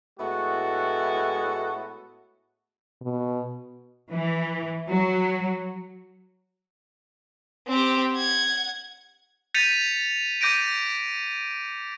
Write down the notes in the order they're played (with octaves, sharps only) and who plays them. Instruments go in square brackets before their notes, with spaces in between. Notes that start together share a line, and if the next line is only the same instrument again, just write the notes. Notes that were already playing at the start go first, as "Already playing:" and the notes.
[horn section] A2 G#3 B3 E4 F#4 A4
[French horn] B2
[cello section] E3
F#3
[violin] C4 G4
F#5 G#6
[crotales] G6 A6 B6 C#7 D#7 F7
D6 G6 A#6 D7 D#7